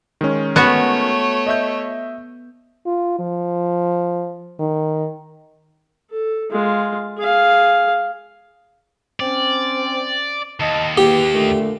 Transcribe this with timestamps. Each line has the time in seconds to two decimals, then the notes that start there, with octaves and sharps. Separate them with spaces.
0.21 D#3 G#3 C#4
0.56 A3 B3 F#4 C#5
1.47 D#5 E5 G6
2.86 F4
3.19 F3
4.59 D#3
6.10 A4
6.51 G#3 F4
7.18 G#4 F5
9.20 C4 C#4 D5
10.60 D#2 D#5 A5
10.97 E2 A#3 G4
11.33 A#2 D3 A3